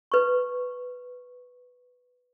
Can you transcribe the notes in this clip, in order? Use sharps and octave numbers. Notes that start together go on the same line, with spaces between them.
B4 C#6